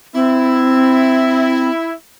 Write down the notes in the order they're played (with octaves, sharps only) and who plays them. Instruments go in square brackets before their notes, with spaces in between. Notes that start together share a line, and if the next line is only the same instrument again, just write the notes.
[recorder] C4 [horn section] E4